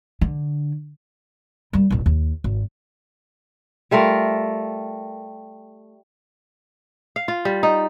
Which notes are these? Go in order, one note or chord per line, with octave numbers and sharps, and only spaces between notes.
D3
G3 A#3
D#1 A1
D#2
G#1
G3 A3 F4 A#4
F5
F4
G3
D#4